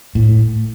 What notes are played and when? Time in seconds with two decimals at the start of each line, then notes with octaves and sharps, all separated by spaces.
0.15 A2